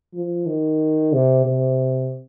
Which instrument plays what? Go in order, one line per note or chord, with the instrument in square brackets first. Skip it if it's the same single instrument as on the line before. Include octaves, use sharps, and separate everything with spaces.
[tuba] F3
D#3
C3
C3